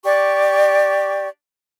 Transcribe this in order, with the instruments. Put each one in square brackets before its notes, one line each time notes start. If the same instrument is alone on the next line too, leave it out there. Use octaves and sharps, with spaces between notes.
[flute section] G4 D5 C#6